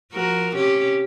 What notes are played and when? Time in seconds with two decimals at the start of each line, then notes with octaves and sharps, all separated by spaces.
0.12 F3 F#4 A#4
0.56 C3 C#4 G4